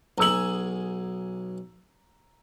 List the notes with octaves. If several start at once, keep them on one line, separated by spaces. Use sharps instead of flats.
B1 G#4 A#5 E6 F#7